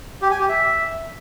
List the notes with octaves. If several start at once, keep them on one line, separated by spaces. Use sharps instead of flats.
G4
G#5
G4
E5